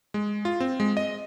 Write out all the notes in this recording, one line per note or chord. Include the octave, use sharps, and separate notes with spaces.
G#3
F4
C4
G#3
D#5